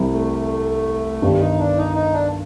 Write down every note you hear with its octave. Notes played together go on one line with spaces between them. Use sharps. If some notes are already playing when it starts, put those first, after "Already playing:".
Already playing: C2 C3 G3
A3
G1 G2 D#3 G3
D#4
D4
D#4
D#4
D4